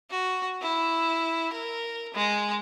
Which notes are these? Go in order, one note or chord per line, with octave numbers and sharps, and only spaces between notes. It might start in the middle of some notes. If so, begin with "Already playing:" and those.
F#4
E4
A#4
G#3